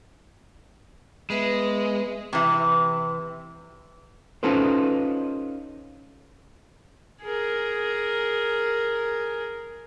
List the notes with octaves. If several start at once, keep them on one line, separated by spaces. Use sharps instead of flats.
G#3 B3 B4 E5
C3 E3
C#4 D#4 F4 A4 B4 C5
G#4 A#4